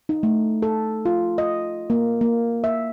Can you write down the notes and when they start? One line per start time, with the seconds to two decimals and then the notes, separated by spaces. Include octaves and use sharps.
0.09 D#4
0.23 A3
0.62 A4
1.05 F4
1.38 D#5
1.90 A#3
2.21 A#3
2.64 E5